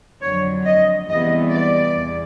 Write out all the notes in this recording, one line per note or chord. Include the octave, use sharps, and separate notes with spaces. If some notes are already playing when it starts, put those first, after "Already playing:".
F2 D3 F#3 C#5
D#5
E2 C3 E3 G3 B3 D#5
D5
E2